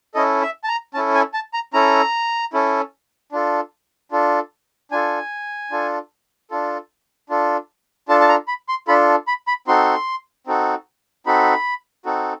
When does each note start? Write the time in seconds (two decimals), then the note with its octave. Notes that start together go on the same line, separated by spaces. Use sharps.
0.14 C#4 E4 A4 D#5
0.42 E5
0.64 A5
0.68 A#5
0.94 C#4 E4 A4 A5
1.14 G#5
1.34 A5
1.53 A#5
1.73 C#4 E4 A4 A#5
2.53 C#4 E4 A4
3.32 D4 F4 A4
4.11 D4 F4 A4
4.91 D4 F4 A4 G#5
5.71 D4 F4 A4
6.50 D4 F4 A4
7.29 D4 F4 A4
8.08 D4 F4 A4 A5
8.21 A5
8.29 A#5
8.48 B5
8.69 C6
8.88 D4 F4 A4 B5
9.27 B5
9.47 B5
9.67 C4 D#4 F#4 A4 C6
10.47 C4 D#4 F#4 A4
11.26 C4 D#4 F#4 A4 B5
12.05 C4 D#4 F#4 A4